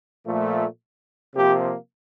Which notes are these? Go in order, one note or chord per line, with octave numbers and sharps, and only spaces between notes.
A#2 F3 A3
C3 F3 A#3 G4